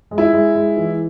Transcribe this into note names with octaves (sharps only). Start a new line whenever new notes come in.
G#3
E4
G#3
G#3
E3